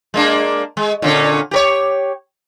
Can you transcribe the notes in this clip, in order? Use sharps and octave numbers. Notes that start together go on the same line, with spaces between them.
G#3 A#3 D4
G#3
A#2 D3 C#4
G4 A#4 C#5